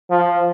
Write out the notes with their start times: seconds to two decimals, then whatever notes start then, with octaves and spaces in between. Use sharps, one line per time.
0.11 F3